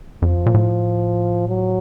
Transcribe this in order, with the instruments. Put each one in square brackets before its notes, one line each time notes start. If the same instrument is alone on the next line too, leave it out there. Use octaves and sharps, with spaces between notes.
[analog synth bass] F2 [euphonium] F3
[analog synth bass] A#2
A2
[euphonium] F#3